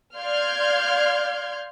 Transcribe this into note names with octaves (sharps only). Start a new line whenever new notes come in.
D5 F5 C6 F6 G6 G#6